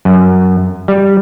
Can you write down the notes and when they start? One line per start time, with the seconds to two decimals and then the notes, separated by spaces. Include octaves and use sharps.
0.05 F#2
0.88 G3